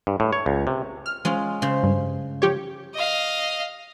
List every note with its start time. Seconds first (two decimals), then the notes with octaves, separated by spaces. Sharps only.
0.07 G2
0.20 A2
0.33 C#5
0.46 C#2
0.67 C3
1.06 F6
1.25 G#3 C#4 F4
1.62 C#3 C5
1.83 G2
2.42 F3 G4 C#5
2.94 D#5 F5